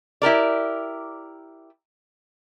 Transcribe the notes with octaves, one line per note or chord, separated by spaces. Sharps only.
E4 G4 A#4 D5